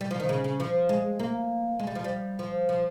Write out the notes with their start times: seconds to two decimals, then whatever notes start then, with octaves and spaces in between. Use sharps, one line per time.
0.01 G3
0.11 F3
0.20 D#3
0.29 C#3
0.44 C#3
0.60 F3
0.89 G#3
1.19 A#3
1.79 G#3
1.87 G3
1.95 F3
2.04 G3
2.39 F3
2.69 F3